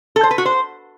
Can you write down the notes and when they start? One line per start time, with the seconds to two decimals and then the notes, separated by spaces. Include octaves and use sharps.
0.16 A4
0.23 C5
0.31 B4
0.38 F#4
0.45 C5